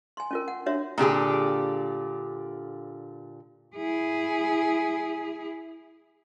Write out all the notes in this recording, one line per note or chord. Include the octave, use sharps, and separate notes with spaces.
G#5 C6
C#4 F4 A#4
F#5
D4 F#4 C#5 E5
A#2 D3 G4 G#4
E4 G#4